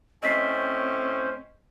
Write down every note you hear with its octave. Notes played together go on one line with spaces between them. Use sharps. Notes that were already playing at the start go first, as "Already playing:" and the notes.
A2 C4 C#4 C5 D#5 B6 C7